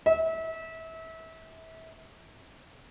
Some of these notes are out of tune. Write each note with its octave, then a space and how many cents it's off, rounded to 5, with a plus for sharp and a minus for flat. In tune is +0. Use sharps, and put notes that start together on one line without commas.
E5 -30